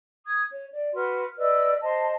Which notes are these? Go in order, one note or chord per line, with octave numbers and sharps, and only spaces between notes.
D#6 G#6
C#5
D5
F#4 B4 C6 F6
B4 D5 D#5 E6
C5 D#5 A5 C6